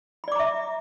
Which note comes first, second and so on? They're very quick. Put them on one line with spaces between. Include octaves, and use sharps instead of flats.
B5 D5 D6 A#5 E5